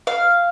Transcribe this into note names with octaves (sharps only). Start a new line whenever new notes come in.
F5